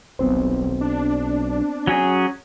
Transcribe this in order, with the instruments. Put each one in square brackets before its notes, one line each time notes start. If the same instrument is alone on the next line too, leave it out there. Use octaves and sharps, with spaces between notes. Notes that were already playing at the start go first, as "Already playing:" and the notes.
[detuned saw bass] D#1 [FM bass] B1 [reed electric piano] B3 C4 C5
[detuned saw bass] D4
[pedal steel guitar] F#3 C#4 G#4